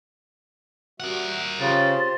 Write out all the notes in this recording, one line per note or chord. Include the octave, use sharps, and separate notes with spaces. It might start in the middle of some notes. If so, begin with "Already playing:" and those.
G3 F#4 A#4 E5 F#5
C#3 F4 G4 C5 A6